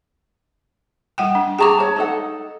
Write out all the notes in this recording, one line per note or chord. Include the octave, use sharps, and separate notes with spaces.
G3 F#5 G5
D4
G#4 G5 A5 A#5 C#6 D6
C#5 A5
D#4 A4 F#5